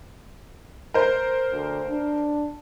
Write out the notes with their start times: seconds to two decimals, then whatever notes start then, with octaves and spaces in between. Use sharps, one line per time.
0.94 A#4 C5
1.52 D2
1.90 D4